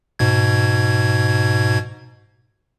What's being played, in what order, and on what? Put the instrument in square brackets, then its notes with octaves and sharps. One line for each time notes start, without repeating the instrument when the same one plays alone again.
[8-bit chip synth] G#2 B2 G#6